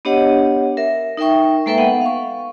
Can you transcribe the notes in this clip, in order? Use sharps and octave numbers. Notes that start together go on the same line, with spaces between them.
B3 D4 G4 C#5 D#5 F#5
A#4 E5
D#4 A#4 E5 G5 C#6
G#3 A#3 A4 B4 E5 G5
B3 F#5
F5 C#6